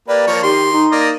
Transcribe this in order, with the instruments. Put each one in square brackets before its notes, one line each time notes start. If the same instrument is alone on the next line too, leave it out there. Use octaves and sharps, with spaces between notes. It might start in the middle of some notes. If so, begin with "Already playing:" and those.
[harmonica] A#3 G4 B4 [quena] D5
[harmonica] F3 A#3 C#5
[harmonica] D#3 C6 [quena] G4
[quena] D#4
[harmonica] A#3 D5 D#5